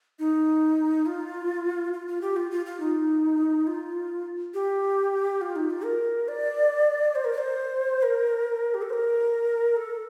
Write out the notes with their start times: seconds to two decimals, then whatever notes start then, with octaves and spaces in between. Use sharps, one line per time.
0.19 D#4
1.06 F4
1.93 F4
2.07 F4
2.21 G4
2.36 F4
2.51 F4
2.66 F4
2.80 D#4
3.67 F4
4.54 G4
5.41 F4
5.56 D#4
5.70 F4
5.84 A#4
6.28 D5
7.15 C5
7.25 A#4
7.33 D5
7.38 C5
8.03 A#4
8.74 G4
8.82 A4
8.90 C5
8.93 A#4
9.77 A4